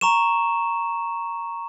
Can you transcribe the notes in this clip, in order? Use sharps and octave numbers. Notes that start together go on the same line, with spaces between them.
A#5 C#6 E7